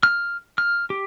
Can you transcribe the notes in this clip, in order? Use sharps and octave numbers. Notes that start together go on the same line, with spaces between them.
F6
F6
G4